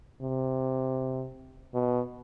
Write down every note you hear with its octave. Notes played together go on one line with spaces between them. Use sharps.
C3
B2